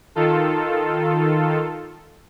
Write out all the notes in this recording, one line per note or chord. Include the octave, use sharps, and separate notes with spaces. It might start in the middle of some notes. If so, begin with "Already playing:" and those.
D#3 F4 A4